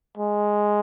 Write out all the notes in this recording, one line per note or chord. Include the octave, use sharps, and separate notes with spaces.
G#3